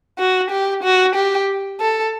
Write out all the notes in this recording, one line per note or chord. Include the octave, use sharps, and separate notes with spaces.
F#4
G4
F#4
G4
A4